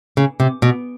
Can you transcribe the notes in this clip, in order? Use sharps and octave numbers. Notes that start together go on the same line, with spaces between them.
C#3
C3
B2